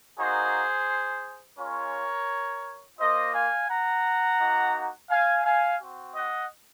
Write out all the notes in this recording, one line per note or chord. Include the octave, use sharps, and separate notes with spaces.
A#3 D#4 F#4 G#4 C5
G#3 C#4 F4 A#4 C#5
A#3 F4 C5 D#5
F5 G#5
F#5 A#5
A#3 D#4 F#4
F5 G#5
F5 G#5
C4 F#4
D#5 F#5